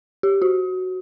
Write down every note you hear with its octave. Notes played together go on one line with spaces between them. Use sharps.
G4
F#4